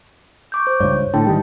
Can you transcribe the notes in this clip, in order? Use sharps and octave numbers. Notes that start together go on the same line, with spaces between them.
C#6 D6 G6
C5
C#2 G2 C#5
A2 D3 E4 G5 A5
G#2 D#3 G3